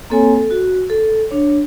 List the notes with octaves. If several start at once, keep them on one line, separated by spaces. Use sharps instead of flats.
A#3 C4 A4 C#5 G#5
A4
F#4
A4
D4 C#5